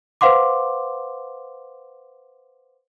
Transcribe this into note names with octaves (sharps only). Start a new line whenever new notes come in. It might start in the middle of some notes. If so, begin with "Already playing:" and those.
B4 C5 F5 F#5 C6 D6